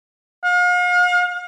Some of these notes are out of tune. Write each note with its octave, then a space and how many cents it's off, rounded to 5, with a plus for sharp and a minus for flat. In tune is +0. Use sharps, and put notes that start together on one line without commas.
F5 +40